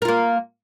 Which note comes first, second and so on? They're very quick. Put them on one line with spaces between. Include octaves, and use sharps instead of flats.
A#4 F4 A#3